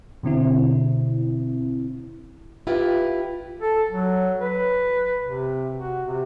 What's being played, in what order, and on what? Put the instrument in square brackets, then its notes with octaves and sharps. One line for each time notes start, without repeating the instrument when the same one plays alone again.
[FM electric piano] B2 D3 C4 E4
[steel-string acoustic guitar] E4 F4 G4 B4
[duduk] A4
F#3
B4
C3
F#4
C3